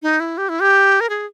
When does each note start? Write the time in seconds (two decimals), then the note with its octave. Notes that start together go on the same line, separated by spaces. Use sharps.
0.02 D#4
0.20 E4
0.38 G4
0.49 E4
0.61 G4
1.01 A#4
1.10 G#4